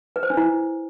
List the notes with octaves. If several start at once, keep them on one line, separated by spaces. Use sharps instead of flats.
B4
C5
D4
E4